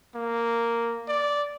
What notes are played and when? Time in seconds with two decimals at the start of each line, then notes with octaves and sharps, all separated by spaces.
0.16 A#3
1.08 D5